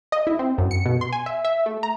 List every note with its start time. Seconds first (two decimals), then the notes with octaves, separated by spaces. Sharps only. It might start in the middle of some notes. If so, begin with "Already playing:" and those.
0.12 D#5
0.27 E4
0.39 C4
0.58 F#2
0.71 C#7
0.85 B2
1.01 C6
1.12 G#5
1.26 E5
1.45 E5
1.66 A3
1.83 A#5